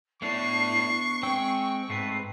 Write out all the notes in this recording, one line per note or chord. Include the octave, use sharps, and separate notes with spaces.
A3 B3 D4 E4 C#6 C7
G#3 C4 G5
G#2 A3 C4 B4 C7